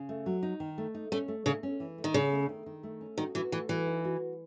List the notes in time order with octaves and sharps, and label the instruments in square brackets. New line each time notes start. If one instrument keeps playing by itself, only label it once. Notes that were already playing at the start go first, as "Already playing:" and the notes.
Already playing: [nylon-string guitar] C#3
A3
F#3
D#4
D#3
A3
D#4
[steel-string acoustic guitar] A3 [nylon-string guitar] C#4
[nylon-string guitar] A3
[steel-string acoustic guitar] C#3 [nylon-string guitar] A3
[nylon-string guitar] C#4
E3
A3
[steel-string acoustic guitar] D#3
[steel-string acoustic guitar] C#3 [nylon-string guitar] C#4
[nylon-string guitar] A3
D#3
D#3
A3
C#4
[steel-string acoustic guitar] D#3 [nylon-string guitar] F#4
[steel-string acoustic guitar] E3 [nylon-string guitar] F#4
[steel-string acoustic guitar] E3 [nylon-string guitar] A3
[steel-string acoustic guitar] E3 [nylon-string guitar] F#4
[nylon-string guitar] D#4
F#4